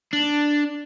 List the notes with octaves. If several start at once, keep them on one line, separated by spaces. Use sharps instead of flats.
D4